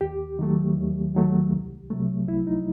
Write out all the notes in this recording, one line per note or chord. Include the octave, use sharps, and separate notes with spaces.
D#2 G4
D#3 F#3 A3
D#2
D#3 F#3 A3
C2
C3 F#3 A3
C2 E4
D#4